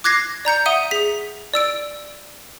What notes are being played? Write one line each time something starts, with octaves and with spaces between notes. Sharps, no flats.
D6 F#6 G#6 A#6 C7
D5 A#5 G6 C#7
E5 F#5 D#6 D#7 G7
G#4 B6
D5 E6 D7